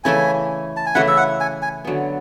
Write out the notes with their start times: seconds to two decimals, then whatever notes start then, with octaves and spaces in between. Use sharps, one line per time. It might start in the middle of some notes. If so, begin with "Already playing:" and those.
0.04 C#3 E3 A3 E4 G#5
0.77 A5
0.86 G#5
0.95 C#3 E3 A3 E4 F#5
1.08 E5
1.17 F#5
1.40 G#5
1.62 G#5
1.85 D3 F#3 B3